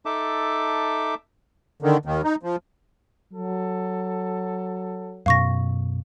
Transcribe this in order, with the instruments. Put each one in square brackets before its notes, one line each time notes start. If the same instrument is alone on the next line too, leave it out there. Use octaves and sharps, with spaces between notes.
[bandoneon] D#4 A4 E5 A5 D6
[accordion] D3 D#3
D#2 D#3
D#4
F3
[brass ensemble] F#3 A4
[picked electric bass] F#2 B2 [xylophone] F5 C#6 A#6